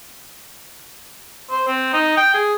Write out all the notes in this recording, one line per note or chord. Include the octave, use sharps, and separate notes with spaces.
C5
C4
D#4
G5
G#4